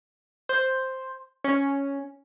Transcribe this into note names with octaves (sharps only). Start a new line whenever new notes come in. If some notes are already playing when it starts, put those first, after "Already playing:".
C5
C#4